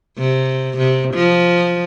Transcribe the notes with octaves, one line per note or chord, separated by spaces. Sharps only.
C3
C3
F3